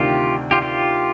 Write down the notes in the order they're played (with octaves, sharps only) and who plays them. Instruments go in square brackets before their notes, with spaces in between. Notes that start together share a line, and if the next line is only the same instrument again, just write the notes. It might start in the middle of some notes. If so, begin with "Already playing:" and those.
Already playing: [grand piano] D2 C3 D#3 [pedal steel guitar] F4 G4
[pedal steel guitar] F4 G4
F4 G4